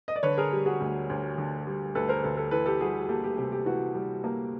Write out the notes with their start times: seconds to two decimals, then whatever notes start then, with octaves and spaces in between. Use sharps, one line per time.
0.08 D#5
0.16 D5
0.23 D3 B4 C#5
0.38 G#4 A#4
0.52 G3 G4
0.66 F#4 G#4
0.80 D2
1.10 D2
1.38 D3
1.67 G3
1.95 D2 A4 B4
2.08 A#4 C5
2.23 D2 A4 B4
2.37 A4 B4
2.51 E3 A4 B4
2.66 G4 A4
2.80 G3 F#4 G#4
3.09 A#3 G4 A4
3.24 G4
3.38 C3 G4
3.52 G4
3.66 E3 F#4
3.94 G3
4.24 A#3